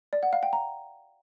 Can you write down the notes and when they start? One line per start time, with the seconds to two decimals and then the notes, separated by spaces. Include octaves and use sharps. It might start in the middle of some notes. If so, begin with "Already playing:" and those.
0.13 D5
0.23 F#5
0.33 F5
0.43 G5
0.53 A#5